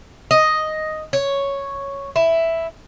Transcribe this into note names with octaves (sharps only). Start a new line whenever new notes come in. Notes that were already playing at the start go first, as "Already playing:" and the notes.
D#5
C#5
E4